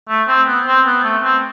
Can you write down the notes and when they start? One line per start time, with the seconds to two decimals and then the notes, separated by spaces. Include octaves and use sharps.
0.09 A3
0.28 C4
0.47 B3
0.67 C4
0.86 B3
1.04 A3
1.23 C4